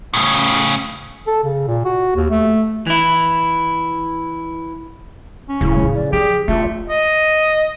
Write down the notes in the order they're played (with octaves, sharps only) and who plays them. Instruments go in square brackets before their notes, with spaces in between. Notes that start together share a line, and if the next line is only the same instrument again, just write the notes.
[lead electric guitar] A2 C#3
[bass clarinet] A4
C#3
A#2
F#4
D#2
A3
[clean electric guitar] E3 E4
[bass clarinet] C#4
[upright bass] D1 B3 [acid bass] C#3 [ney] E4
[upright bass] A2 E3
[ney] D5
[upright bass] F3 [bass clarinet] G4 [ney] G#4
[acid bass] E1 [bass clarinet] A3 [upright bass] C#4 [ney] F4
[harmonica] D#5